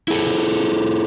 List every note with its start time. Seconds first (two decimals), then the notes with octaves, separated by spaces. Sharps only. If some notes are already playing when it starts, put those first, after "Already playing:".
0.08 E4 G#4 A4